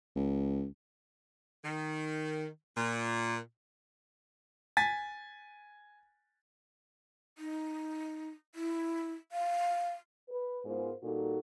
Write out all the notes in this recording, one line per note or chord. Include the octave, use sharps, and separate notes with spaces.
C#2
D#3
A#2
G#5 A6 B6
D#4
E4
F5
B4
G#2 G#3 B3 F4 A#4 C5
A#2 G3 D#4 F#4 A4